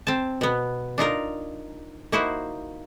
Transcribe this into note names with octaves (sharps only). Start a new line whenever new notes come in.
C4 A5
B2 B3
D4 D#4 F4 A#4
A#3 D#4 E4 F#4 C5